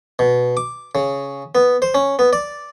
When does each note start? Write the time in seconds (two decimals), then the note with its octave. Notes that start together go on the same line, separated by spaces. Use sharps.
0.19 B2
0.57 D6
0.95 C#3
1.55 B3
1.82 C5
1.94 C#4
2.19 B3
2.33 D5